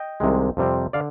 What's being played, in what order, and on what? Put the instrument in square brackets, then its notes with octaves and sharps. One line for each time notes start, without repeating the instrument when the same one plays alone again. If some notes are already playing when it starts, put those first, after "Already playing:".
Already playing: [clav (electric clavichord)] D#5 G5
C2 C3 D#3 G#3
F2 C3 G3 C4
D3 D5 F5